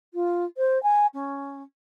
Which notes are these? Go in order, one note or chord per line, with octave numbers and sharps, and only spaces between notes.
F4
C5
G#5
C#4